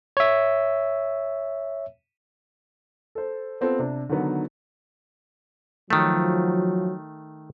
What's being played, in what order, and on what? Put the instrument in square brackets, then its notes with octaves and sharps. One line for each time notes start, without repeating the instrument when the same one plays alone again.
[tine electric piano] C#5 E5
[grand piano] A4 C5
B3 C4 F4 A4
C3 D4
D3 D#3 F#3 B3
[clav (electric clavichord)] D#3 A3 [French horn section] F3 F#3